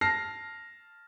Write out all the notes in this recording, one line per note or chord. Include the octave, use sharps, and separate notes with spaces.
A5 F6 A#6 C7